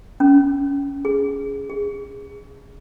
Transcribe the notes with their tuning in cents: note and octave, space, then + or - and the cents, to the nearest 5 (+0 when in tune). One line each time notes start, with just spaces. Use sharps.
C#4 +20
G#4 +0
G#4 -25